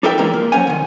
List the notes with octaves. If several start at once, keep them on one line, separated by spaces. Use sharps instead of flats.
D4 D#4 A4 A#4 E5 G5
E3 F3 G#3 A#3 C#4 A#4
A#3
F#3 C#4 C5 C#5 F#5 G#5
C2 D#3